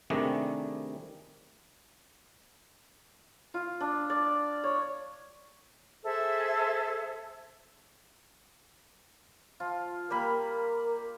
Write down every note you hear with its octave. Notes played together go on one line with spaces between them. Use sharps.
C3 D#3 G3 A3 D4 G#4
F4
D4
D5
C#5
G#4 A4 C5 E5
F3 F4
G3 A#3 A#4 B5